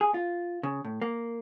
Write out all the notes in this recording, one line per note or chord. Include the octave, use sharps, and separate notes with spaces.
G#4
F4
C#3
A2
A#3